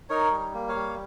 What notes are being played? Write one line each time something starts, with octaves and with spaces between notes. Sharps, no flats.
D#4 A#4 C#5
G3
A#3
C#5 F5
G3